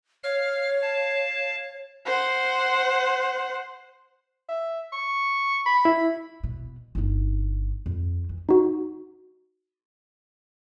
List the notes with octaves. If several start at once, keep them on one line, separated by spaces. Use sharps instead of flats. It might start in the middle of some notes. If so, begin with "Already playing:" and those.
C#5 F5 F6
F5 A5
C5 F#5
E5
C#6
B5
E4
B2
G1 D#4
F2
E3
D#4 F#4